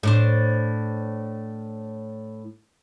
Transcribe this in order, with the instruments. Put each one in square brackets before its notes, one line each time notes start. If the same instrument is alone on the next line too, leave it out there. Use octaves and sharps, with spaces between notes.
[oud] A2 D4 C5